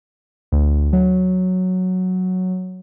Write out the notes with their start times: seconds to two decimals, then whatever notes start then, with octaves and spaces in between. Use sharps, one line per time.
0.52 D2
0.93 F#3